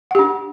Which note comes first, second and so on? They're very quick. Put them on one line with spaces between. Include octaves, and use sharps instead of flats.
F#5 G4 D4